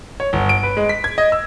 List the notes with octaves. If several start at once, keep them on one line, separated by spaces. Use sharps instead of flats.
C#5
G1
D7
B4
G#3
B6
G#6
D#5
E6